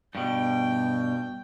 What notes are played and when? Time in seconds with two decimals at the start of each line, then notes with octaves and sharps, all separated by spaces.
0.15 G2 B2 G5